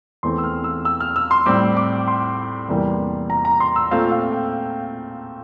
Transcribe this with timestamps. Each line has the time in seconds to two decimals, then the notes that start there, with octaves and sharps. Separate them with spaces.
0.23 E2 E3 A3 C4 C6
0.38 E6
0.44 F6
0.64 E6
0.85 E6
1.00 F6
1.16 E6
1.31 C6
1.46 A2 G3 C4 D6
1.77 D6
2.08 C6
2.68 E2 C3 E3 G3 A#3
3.30 A#5
3.45 A#5
3.60 C6
3.76 E6
3.91 A#2 A3 C4 F5
4.11 F5
4.32 G5